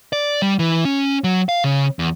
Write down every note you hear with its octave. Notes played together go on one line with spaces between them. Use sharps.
D5
G3
E3
C#4
F#3
F5
C#3
E2